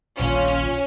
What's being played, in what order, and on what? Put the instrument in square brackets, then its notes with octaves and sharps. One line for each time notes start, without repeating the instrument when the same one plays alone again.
[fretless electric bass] D#1 A#1 D#2 [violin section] C#4 [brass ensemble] F4